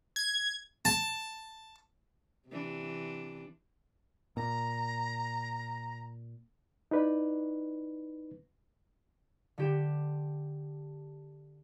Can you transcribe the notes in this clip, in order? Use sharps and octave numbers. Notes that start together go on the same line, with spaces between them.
G#6
A5
C3 E3 D4
A#2 A#5
D#4 E4 B4 D5
D3 G4 E7